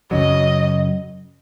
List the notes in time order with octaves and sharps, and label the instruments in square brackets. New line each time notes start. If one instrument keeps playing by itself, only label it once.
[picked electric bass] F#2 C#3 F#3 [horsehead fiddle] D#5